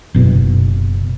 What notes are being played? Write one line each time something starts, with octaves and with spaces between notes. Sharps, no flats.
F#1 B2